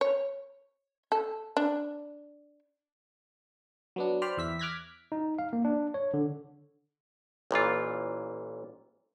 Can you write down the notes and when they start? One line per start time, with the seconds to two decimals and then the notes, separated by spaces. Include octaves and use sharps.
0.01 C#5
1.12 A4
1.57 D4
3.96 F#3 B3 D4
4.22 C5 D5 G5 B5 F6
4.37 E2 E5 B6
4.59 D6 F6 F#6 G#6 A#6 B6
5.12 D#4
5.39 F5
5.53 A#3
5.65 D4
5.94 C#5
6.14 D3
7.51 A1 A#2 E3 F4